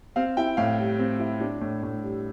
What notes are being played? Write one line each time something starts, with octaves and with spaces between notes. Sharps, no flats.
C4 F5
E4 G5
A2 F5
G3
C4
E4
D4
A2
A2
G3